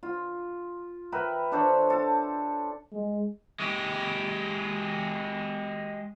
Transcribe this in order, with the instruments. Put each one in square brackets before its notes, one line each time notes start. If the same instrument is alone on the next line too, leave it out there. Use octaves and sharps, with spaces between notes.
[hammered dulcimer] F4
A#4 B4 E5 G5
D4 A4 C5 C#5
A4
[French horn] G#3
[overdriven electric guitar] G#3 G4